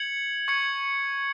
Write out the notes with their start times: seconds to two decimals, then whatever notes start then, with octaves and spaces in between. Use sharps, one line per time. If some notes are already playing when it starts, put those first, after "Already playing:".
Already playing: G#6 C#7 F#7
0.48 C#6 G#6 C#7